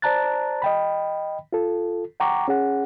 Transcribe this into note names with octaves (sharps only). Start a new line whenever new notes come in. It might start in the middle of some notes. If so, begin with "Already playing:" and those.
C5 D5 A5 A#5 F#6 A6
D#5 G5 B5
F4 A4
F#5 G5 A#5 C#6 D6
C#4 G#4 F#5